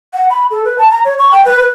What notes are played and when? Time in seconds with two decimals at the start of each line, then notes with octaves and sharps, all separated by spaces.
0.13 F#5
0.30 B5
0.51 A4
0.65 B4
0.78 A5
0.91 A#5
1.05 C#5
1.19 C#6
1.31 G5
1.45 B4
1.60 B4